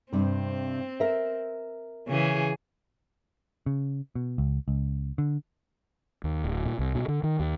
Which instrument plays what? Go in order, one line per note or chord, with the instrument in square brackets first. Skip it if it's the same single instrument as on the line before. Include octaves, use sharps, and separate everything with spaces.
[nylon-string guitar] G2 C3 [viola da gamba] C4
[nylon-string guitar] A#4 E5
[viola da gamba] C#3 E3 G#4
[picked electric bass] C#3
B2
C#2
C#2
D3
[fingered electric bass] D#2
D1
A#2
C2
B2
D3
D#3
D#2